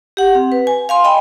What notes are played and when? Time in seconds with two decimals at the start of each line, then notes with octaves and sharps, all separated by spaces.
0.17 G4 F#5
0.35 C4
0.52 B4
0.67 G#5
0.89 F5 G#5 C6
1.04 D#5 G5 B5